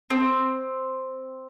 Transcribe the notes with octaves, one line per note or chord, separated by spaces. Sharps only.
C4